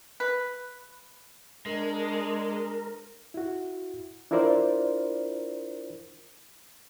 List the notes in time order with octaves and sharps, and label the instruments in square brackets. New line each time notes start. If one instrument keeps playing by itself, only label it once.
[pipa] B4
[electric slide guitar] G#3 [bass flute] D4 [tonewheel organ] A#4
[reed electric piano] E4 F#4
D4 E4 F4 A#4 C5 D5